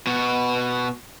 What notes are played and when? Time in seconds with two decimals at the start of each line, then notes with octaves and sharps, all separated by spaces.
0.07 B2 F#4